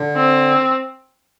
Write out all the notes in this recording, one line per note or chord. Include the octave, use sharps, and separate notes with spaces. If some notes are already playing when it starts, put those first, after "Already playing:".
Already playing: D3
C4